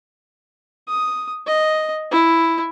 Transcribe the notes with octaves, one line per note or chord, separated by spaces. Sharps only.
D#6
D#5
E4